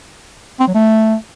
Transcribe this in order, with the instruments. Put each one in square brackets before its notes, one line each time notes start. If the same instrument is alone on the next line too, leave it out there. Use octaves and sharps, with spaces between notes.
[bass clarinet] C4
F#3
A3